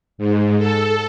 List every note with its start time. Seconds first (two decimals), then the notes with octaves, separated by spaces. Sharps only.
0.18 G#2
0.59 A4